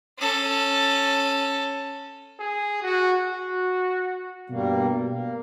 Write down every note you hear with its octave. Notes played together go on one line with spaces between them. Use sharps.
C#4 A4
G#4
F#4
F#4
G2 B2 G3 A#3
A#3